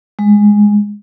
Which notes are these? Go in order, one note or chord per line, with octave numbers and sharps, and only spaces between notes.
G#3